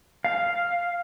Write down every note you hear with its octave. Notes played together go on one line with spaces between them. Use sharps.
F5